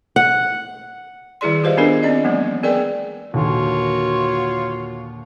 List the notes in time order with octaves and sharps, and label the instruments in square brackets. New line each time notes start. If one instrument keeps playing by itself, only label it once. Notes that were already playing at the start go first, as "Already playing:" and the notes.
[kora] F#5
[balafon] D#3 G3 E4 G#4 D5 C6
F4 G4 B4 C5 D#5 F5
B3 C#4 D4 G#4 A#4
C4 C#4 D5 D#5
E3 F#3 G#3 A#3 B3
B3 G#4 A#4 B4 D5 G5
[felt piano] D#2 A#2 D3 [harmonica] F4 C#5 [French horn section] F#4